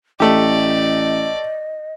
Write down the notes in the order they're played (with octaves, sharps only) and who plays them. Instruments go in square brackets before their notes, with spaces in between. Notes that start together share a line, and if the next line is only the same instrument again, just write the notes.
[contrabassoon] A1 [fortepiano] A3 G4 [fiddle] D5 [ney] D#5